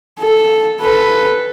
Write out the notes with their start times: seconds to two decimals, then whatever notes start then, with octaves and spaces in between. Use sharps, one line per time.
0.19 A4
0.81 A4 B4